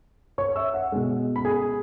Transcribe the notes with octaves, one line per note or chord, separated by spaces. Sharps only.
C#5 C#6
E5 E6
F#5
B2 G#3
B5
G#4 G#5